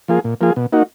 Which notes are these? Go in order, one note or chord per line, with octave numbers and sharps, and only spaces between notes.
F3 A#3 F4 G#4
A#2
F3 A#3 F4 G#4
B2
A#3 D#4 F#4